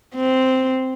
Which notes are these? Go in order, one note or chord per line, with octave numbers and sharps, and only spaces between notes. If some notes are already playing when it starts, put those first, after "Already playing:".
C4